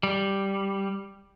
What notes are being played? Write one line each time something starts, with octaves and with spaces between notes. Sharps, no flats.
G3